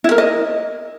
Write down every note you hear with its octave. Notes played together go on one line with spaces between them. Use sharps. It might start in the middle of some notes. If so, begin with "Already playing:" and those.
E4
A#4
D#5